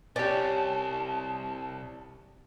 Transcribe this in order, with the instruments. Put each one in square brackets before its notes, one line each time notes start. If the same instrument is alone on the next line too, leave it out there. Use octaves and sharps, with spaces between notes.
[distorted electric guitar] C2 [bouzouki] C#4 [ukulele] G4 D5 [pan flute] A5